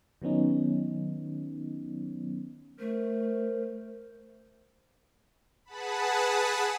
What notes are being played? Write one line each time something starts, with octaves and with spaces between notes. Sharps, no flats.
D#3 F#3 B3 C#4 D#4
A3 A#4 C5
G#4 B4 F#5 A5 B5